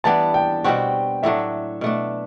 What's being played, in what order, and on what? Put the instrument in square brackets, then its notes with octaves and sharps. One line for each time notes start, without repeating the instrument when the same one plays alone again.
[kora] E3 G3 B3 D4 [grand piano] A5
[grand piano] G5
[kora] B2 G3 C4 F#4
[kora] A2 F#3 A3 D4 [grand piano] E5
[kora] B2 A3 D4